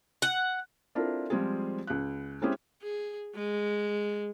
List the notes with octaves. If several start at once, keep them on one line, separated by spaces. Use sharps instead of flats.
F#5
C4 D4 E4 F4 A4 A#4
F3 G3 G#3 C4 F4 G#4
C#2 F#6
G#3 C4 C#4 E4 G4 G#4
G#4
G#3